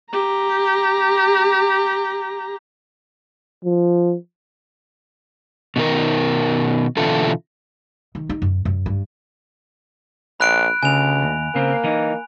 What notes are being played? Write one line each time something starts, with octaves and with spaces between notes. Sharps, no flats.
G4 A#5
F3
B2 D#3 A#4
B2 D3 E3 E4 F4 A4
D#3
D#4
F#2
F#2
G2
A#1 B5 F#6 D7
D2 C#3 G#5 F7
D#2
C#3 A#3 C4
E3 D#4